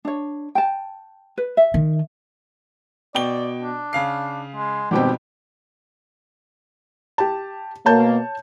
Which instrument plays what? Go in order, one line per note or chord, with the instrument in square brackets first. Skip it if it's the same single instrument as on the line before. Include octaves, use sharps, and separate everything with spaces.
[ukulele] D4 C#5
G5 A5
B4
E5
[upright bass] D#3
[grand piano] B2 G5 G7 [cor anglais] D5
[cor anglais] D4
[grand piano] C#3 F5 C7
[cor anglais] G#3
[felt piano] G#1 B2 C4 [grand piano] F2 G3 G5 [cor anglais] G4
[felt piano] G4 A5
[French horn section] B2 A#3 [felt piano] C#5 A5 G6